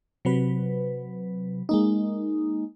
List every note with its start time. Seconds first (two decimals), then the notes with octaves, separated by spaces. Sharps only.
0.25 C3 F#3 B4
1.69 G#3 A#3 D#4